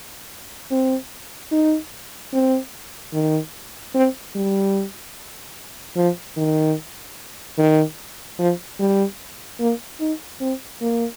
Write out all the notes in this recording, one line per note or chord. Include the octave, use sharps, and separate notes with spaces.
C4
D#4
C4
D#3
C4
G3
F3
D#3
D#3
F3
G3
A#3
D#4
C4
A#3